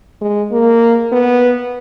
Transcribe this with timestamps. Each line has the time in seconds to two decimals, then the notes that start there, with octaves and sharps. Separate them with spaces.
0.21 G#3
0.51 A#3
1.12 B3